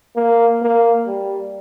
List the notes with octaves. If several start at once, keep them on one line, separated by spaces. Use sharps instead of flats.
A#3
A#3
G3